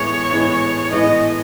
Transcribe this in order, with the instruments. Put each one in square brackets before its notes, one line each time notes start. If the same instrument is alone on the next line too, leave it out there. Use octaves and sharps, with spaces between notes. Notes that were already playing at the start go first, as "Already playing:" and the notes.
Already playing: [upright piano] A2 E3 G#3 B3 [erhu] C#5
[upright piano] A2 E3 G#3 B3
[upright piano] A2 E3 G#3 B3 [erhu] D#5